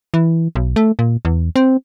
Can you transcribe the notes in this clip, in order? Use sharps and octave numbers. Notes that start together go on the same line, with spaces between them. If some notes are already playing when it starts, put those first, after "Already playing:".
E3
B1
A3
A#2
E2
C4